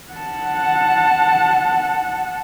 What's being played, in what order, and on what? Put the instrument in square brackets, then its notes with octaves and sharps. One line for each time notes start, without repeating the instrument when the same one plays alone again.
[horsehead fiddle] F#5 A5